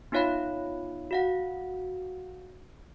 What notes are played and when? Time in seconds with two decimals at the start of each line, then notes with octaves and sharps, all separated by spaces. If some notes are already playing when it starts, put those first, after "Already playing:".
0.12 B3 D#4 F4 C#5 F5 B5
1.11 F#4 F5 F#5